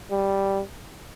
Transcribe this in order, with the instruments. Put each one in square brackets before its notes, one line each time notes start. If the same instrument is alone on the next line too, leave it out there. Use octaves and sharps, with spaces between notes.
[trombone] G3